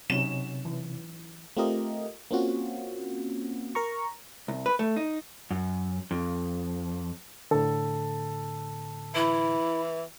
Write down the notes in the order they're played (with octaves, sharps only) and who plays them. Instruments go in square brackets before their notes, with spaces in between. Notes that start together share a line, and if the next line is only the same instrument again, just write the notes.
[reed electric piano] C3 [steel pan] F#3 C#4 D#4 [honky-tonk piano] E7
[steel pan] E3
[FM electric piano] A3 C4 F4 G4 A#4 D#5
A#3 C4 C#4 F4 F#4
A#4 A#5 C#6
[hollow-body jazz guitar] C2
B4
A3
D#4
[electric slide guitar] F#2
F2
[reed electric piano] A2 D3 [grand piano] A4
[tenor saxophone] E3 [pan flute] E4